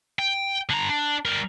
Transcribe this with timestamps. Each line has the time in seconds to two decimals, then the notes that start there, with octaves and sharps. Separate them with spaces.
0.19 G5
0.70 D3 A#5
0.89 D4
1.25 G3 A#4